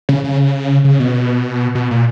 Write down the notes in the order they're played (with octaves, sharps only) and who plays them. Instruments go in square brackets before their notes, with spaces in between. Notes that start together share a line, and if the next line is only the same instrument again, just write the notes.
[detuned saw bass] C#3
C#3
C#3
B2
B2
A#2